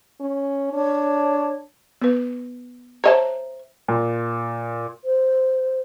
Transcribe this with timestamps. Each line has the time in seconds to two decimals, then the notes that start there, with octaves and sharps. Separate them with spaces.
0.20 C#4
0.73 D4 C#5
2.02 B3 B4
3.04 C5 C#5 D#5 E5 A5 A#5
3.88 A#2
5.05 C5